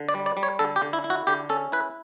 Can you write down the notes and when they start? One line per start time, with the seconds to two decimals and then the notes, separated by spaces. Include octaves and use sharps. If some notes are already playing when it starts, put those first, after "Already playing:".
Already playing: D3
0.09 D5
0.15 G3
0.26 D5
0.37 G3
0.43 C#5
0.59 D3 A4
0.76 G4
0.82 D3
0.93 E4
1.04 E4
1.10 F#4
1.27 D3 G4
1.49 C#4 A4
1.72 E4 B4